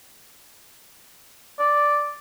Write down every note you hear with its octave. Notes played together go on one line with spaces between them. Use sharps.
D5